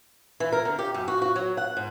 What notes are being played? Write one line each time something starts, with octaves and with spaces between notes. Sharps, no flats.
E3
A#4
D3
G4
F#2
F#4
F#4
F#3
F#5
G#2